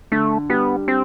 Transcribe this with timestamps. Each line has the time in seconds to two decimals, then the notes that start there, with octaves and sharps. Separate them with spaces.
0.12 D3 A3
0.50 G3 B3
0.88 G3 C4